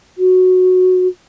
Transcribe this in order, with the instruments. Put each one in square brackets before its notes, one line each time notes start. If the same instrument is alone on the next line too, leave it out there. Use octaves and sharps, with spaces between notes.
[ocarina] F#4